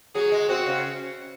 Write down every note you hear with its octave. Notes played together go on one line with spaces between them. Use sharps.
F#3 G#4
G#3
C4 F#4
C#3